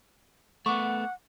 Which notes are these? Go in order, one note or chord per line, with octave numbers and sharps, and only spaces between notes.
A3 B3 F#5 C#6 D6